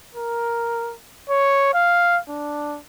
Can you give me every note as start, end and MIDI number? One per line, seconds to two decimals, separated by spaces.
0.15 0.94 70
1.30 1.74 73
1.74 2.19 77
2.29 2.78 62